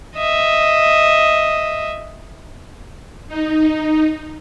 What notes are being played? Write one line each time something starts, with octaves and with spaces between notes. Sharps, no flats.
D#5 E5
D#4